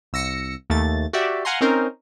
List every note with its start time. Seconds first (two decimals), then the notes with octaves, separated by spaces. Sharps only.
0.13 C2 E6 A#6 C#7
0.70 D#2 A3 A6
1.13 F#4 G4 D5 E5
1.45 F5 F#5 G#5 A#5 C6
1.61 C4 C#4 D#4 A#4 C5